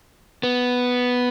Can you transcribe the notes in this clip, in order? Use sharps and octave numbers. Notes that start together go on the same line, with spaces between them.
B3